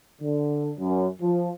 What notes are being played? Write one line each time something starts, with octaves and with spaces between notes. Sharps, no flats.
D3
F#2
F3